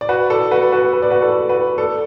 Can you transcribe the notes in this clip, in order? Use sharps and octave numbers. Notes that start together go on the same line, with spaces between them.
D5
F#4 B4
A4 D5
F#4 B4
F#4 B4
B4
D5
F#4 B4
A4 D5
F#4 B4
A4 D5